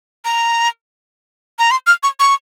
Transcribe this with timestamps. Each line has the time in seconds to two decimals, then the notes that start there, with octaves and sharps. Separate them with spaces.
0.25 A#5
1.59 A#5
1.71 C6
1.87 F6
2.03 C#6
2.20 C#6